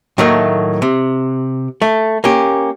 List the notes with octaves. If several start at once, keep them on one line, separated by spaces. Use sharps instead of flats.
A2 D#3 F#3 A3 A#3
C3
A3
A#3 C#4 G4